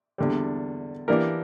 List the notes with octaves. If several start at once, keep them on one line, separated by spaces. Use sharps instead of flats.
E2 D3 G3
E3 A#3 D4 G4 A#4